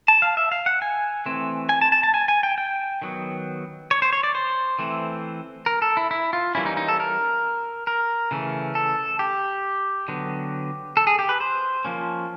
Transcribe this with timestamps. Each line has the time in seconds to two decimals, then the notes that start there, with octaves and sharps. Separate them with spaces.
0.08 A5
0.22 F5
0.37 E5
0.52 F5
0.66 F#5
0.82 G#5
1.26 E3 A3 C4
1.69 G#5
1.81 A5
1.92 A5
2.03 A5
2.14 G#5
2.28 G#5
2.43 G5
2.58 G5
3.02 D#3 F#3 B3
3.91 C#5
4.02 C5
4.13 C#5
4.23 D5
4.35 C5
4.79 E3 A3 C4
5.66 A#4
5.82 A4
5.97 E4
6.11 E4
6.33 F4
6.55 E3 G3 A#3 C#4 E4
6.66 D#4
6.77 D#4
6.88 A4
7.00 A#4
7.87 A#4
8.31 C#3 E3 A3 C#4
8.75 A4
9.19 G4
10.08 D3 F#3 B3
10.97 A4
11.07 G#4
11.19 G4
11.29 B4
11.40 C5
11.85 F3 A#3 C#4